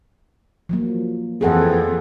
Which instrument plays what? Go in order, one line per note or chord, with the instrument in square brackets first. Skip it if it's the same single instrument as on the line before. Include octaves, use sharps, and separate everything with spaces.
[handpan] F3 F#3 A#3
[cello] F2 E3 [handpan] G#4 A4 F#5